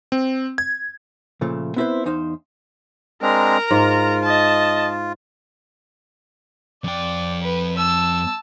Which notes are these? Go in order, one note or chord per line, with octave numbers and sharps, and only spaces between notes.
C4
G#6
A#2 C#3 F3 A3
B3 C4 E4 G4 B4 C5
E2 D#4 C5 F5
G#3 C4 D4 A#4 A#5
G#2 F4
D#5 A5
F2 D5 G5
B4
A5 E6